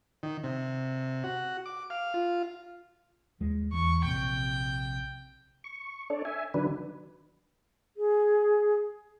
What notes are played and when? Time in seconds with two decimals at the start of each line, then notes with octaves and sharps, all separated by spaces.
0.23 D#3
0.43 C3
1.24 F#4
1.66 D6
1.90 F5
2.14 F4
3.40 D#2 G#3
3.73 E2 C#6
4.04 A#1 C3 G5
5.64 C#6
6.10 D4 A4 C#5 D5
6.25 E5 G#5
6.54 D3 D#3 F#3 D4 B4
7.97 G#4